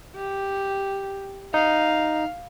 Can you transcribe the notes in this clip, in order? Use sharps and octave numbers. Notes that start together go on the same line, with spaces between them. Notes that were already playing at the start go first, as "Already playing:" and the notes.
G4
D#4 F5